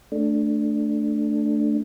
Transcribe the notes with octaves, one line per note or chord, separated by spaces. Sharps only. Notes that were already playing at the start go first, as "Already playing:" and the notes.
A3 D4